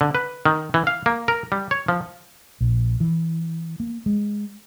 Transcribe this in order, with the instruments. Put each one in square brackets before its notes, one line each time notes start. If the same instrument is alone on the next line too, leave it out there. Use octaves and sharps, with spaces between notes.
[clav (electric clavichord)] D3
B4
D#3
E3
F5
A#3
A#4
G3
C#5
F3
[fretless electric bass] A#1
E3
A#3
G#3